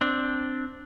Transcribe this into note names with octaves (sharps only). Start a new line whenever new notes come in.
C4 D4